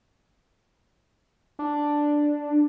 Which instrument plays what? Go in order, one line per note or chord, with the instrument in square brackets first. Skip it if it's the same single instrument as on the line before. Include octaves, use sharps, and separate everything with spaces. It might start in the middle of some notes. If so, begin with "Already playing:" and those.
[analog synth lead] D4